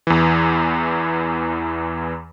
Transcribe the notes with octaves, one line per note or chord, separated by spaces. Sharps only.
E2 E3